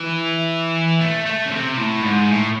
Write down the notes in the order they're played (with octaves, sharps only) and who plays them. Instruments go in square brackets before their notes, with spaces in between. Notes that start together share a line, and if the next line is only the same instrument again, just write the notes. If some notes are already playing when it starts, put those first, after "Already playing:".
Already playing: [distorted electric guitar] E3
A3
A3
C#3
C3
A2
G#2
A2